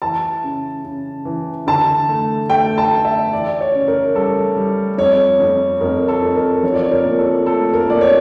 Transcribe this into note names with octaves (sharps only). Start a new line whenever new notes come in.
E3 A5
C#3
C#3
E3
D3 A5
A3
A3 G5
A5
A3
E5
E3 D5
C#5
C#3
A#4
G3 A4
G3
F2 C#5
F2
F2 A#4
A4
F2
A#4
F3 C#5
D5
C#5
A#4
A#2
A4
A3 A4
A#4
A#2 D5
C#5